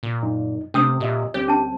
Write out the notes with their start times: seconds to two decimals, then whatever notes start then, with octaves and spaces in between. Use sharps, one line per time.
0.03 A#2
0.23 F#2 D#4
0.74 C3 A3 C4 C#4 D#6 E6
1.00 A#2 G4 D#5 E5
1.34 D2 G3 C4 G4 C#5
1.48 C#4 A5